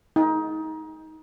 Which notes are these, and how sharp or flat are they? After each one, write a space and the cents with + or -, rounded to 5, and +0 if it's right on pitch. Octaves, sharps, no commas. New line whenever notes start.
D#4 +25